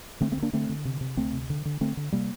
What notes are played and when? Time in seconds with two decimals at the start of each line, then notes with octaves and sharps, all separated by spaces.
0.21 D3 A3 C4
0.32 A3 C4
0.37 D2
0.42 A#3 D4
0.53 D3 A3 C4
0.69 D3
0.85 C3
1.01 C3
1.17 D2 A3 C4
1.33 C3
1.50 D3
1.65 D3
1.81 D3 A3 C4
1.97 D3
2.12 C3 G3 A#3